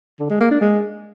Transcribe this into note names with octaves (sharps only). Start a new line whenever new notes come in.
D3
G#3
A#3
D4
G#3